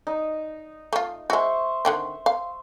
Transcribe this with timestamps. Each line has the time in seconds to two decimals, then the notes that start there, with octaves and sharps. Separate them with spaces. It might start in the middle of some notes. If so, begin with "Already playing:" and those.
0.07 D#4
0.93 A3 F4
1.30 G#3 F#4 C5 E5 C#6
1.85 D3 D#3 C4
2.26 F5